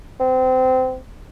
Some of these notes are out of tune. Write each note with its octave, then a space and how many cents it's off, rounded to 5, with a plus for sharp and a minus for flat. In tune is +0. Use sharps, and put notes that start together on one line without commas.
C4 -25